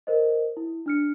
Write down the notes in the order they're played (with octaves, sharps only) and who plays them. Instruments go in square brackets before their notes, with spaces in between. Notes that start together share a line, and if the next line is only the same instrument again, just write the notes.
[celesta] A#4 C5 D#5
E4
D4 F6 C#7